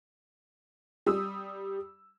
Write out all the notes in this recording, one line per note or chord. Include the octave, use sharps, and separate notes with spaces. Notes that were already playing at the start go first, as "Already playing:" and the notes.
G3 D#6 E6